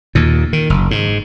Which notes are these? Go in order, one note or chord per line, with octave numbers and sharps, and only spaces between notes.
D#2 A#2
D#3
F#1
G#2